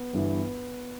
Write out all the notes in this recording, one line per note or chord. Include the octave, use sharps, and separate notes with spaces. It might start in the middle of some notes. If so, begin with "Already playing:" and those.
Already playing: B3 B4
G1 G2 E3